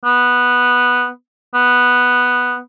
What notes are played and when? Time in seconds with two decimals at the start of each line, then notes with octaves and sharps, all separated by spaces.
0.05 B3
1.54 B3